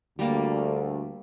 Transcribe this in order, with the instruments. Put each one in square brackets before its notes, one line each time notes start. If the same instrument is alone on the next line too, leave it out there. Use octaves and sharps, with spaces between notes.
[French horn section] D2 [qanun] G3 A#3 A5